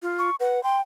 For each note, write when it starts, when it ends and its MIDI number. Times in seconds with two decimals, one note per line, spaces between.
0.02 0.30 65
0.19 0.36 85
0.40 0.62 71
0.40 0.63 78
0.63 0.81 79
0.63 0.77 84